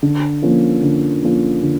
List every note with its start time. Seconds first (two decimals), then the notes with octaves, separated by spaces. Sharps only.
0.03 D3
0.42 F3 A#3 C#4 F4
0.83 D3
1.22 F3 A#3 C#4 F4
1.63 D3